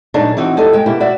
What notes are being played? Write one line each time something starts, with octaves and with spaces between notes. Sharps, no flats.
A#2 F#3 G#3 D4 D#4
E3 C4 D#4 F#4
E2 D#4 G4 A4 D#5
G#3 G5
B2 A#3 E4 G4
F#4 D5 E5